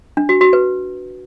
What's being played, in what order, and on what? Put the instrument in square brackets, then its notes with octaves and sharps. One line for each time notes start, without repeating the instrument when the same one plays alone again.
[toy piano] D4
F#4
F#4
B4